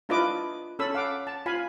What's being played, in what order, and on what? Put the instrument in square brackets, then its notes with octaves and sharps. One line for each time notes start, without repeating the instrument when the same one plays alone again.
[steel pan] D4 E4 F4 B4 D#5 D6
C#4 A4 B5 E6
F5 F#5 D6
A5
F4 F5 G#5 B5